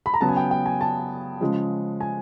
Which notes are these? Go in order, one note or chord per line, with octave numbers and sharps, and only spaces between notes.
B5
A#5
C#3 F#3 B3 A5
G#5
G5
G5
G#5
A5
C#3 F3 G#3
G#5